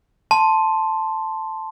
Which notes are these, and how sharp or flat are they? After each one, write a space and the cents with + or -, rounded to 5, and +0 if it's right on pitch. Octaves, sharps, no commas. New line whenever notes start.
A5 +0 C6 +0